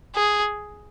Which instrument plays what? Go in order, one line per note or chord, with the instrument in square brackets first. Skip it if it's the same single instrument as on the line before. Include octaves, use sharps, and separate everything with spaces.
[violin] G#4